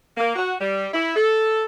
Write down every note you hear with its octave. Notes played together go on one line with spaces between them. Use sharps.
A#3
F#4
G3
E4
A4